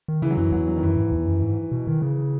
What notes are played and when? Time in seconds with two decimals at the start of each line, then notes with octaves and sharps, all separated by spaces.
0.08 D#3
0.22 C#3 E3
0.31 F#3
0.37 F#2 E3
0.52 E2 F#3
0.68 F#3
0.77 D#3
0.82 F#2 E3
0.97 G#2
1.12 E2
1.27 F#2
1.42 G#2
1.72 B2
1.87 D#3
2.02 C#3